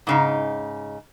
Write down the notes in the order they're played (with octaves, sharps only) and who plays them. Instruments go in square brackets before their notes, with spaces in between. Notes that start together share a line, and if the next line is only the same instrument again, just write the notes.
[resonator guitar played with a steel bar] G#2 C#3 D#4